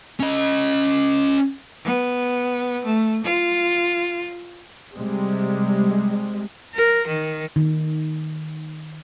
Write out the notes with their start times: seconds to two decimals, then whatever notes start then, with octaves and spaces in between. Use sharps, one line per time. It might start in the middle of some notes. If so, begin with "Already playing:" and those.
0.20 C#4 D#5
1.84 B3
2.85 A3
3.24 F4
4.95 C3 G3 G#3
6.75 A#4
7.08 D#3
7.56 D#3